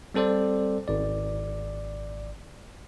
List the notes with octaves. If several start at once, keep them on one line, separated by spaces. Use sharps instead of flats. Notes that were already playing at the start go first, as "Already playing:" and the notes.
G3 C4 A4 C5 D5
G#1 D5